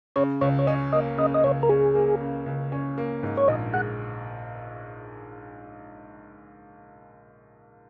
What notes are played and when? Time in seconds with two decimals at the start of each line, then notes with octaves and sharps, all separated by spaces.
0.16 C#3 C#5
0.41 C#2 C#5
0.59 C#5
0.67 C#4 D#5
0.92 A#3 D#5
1.18 C#3 D#5
1.34 D#5
1.44 C#2 C#5
1.63 A#4
1.69 C#4 G#4
1.95 A#3
2.20 C#3
2.46 C#2
2.72 C#4
2.98 A#3
3.23 G#2
3.37 C#5
3.48 A#1 D#5
3.73 G#3 F#5